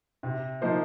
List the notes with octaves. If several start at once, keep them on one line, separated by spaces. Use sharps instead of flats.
C3
F3 A#3 D#4 C5